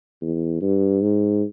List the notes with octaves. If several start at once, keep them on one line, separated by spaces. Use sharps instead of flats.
E2
G2
G#2